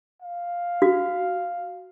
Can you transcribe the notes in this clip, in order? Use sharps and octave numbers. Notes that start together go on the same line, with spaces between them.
F5
F#4